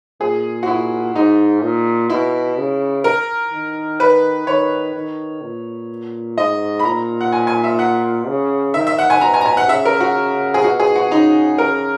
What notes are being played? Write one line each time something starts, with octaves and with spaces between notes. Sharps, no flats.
A#2 G#4
F#4
A#2 E4
G#2 D#4
A#2
B2 E4
C#3
A#4
D#3
B4
D#3 C#5
D#3
A#2
G#2 D#5
B5
A#2 A#5
F#5
G#5
G#5
E5
F#5
C#3
D#3 E5
E5
F#5
G#5
B2 A#5
G#5
A#5
G#5
F#5
C#3 E5
A#4
F#4
G#4
B2 F#4
G#4
F#4
C#3 D#4
A#4